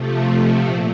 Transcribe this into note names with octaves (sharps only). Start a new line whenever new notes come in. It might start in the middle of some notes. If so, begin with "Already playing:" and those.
Already playing: C3 F3 A3
A#2